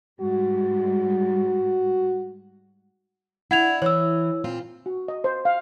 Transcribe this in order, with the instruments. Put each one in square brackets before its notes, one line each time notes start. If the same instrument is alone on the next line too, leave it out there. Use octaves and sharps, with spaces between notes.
[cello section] G#2 G3 G#3 [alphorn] F#4
[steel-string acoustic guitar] D4 E4 [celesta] F#5 G#6 F7
[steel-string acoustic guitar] E3 [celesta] C#5 E6
[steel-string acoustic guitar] A#2 C4 F4
[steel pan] F#4
D#5
C5
F5